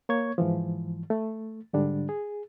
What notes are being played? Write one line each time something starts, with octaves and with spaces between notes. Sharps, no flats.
A#3 C#5 C#6 G#6
G#2 E3 F3
A3
G#2 D3 G3 D4
G#4